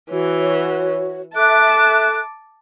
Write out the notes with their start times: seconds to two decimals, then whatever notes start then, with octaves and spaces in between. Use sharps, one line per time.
0.10 E3 F#4 C#5
1.35 A4 E5 A5 D6 F#6